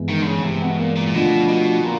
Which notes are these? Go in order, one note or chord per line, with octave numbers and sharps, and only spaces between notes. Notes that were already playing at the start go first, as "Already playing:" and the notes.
Already playing: G2 E3 G#3 B3
D#3
D3
C#3
G2 C3 E3 G#3 B3
B2
A#2
A#2
A#2
B2 D3 F3 A3 D4 F4
B2
A#2 D3